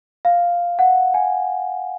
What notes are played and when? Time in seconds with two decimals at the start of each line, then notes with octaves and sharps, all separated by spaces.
0.25 F5
0.79 F#5
1.14 G#5